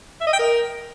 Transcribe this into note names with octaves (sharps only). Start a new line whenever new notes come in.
E5
D#5
G5
A#4